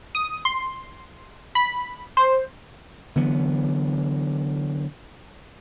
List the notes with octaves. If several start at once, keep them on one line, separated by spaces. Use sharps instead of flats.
D#6
C6
B5
C5
D3 E3 F#3 B3